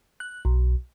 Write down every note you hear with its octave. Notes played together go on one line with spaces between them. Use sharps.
F#6
B1